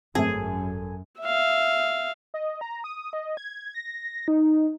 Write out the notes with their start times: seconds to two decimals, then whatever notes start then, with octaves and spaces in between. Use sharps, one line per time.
0.15 G#1 F#2 A3 C4 G#4 A4 G#5
1.21 E5 F5
2.34 D#5
2.61 A#5
2.84 D#6
3.13 D#5
3.37 G#6
3.74 A#6
4.28 D#4